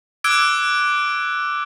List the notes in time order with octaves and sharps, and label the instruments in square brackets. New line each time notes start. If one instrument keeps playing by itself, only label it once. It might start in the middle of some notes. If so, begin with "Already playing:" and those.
[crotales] D6 E6 F#6 G#6 D7 G7